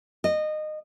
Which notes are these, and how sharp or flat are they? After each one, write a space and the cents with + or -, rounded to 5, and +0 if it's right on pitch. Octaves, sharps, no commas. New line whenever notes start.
D#5 -20